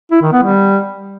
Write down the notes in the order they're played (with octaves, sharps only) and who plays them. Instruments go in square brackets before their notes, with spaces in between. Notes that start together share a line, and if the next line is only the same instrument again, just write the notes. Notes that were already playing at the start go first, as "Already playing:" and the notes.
[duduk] E4
D#3
B3
G3